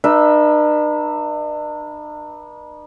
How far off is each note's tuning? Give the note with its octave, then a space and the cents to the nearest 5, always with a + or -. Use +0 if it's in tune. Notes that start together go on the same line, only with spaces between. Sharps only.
D4 +45 B4 -40 E5 +0